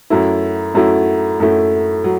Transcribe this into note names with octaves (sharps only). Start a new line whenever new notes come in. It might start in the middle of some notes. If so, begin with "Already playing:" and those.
F#2 F#3 A3 E4
F#2 F#3 A3 E4
F#2 F#3 A3 E4
F#3